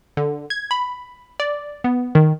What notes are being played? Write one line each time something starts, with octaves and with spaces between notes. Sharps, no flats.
D3
G#6
B5
D5
B3
D#3